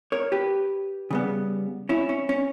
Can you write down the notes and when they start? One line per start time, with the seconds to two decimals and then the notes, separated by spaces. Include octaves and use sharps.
0.12 A#4 C#5
0.32 G4 B4
1.11 C#3 G3 B3
1.89 C#4 E4
2.09 C#4
2.29 C#4